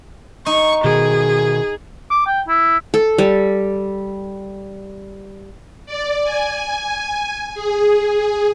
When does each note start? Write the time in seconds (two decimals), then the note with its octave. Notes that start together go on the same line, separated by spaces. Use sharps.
0.46 D#4 C#6
0.84 B2 D#3 G#4
2.11 D6
2.26 G5
2.48 E4
2.94 A4
3.18 G3
5.86 D5
6.24 G#5
7.55 G#4